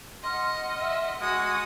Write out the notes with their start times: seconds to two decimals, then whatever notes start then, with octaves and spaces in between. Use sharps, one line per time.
0.23 D#5 F#5 C6 F6
0.81 E5
1.21 G#3 F#4 D#6